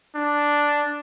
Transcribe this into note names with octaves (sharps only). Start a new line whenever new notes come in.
D4